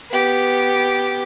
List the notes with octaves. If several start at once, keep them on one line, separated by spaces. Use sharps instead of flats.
B3 G4